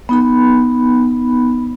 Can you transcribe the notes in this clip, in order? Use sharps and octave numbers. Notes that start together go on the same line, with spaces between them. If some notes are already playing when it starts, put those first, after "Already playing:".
B3 D#4 B5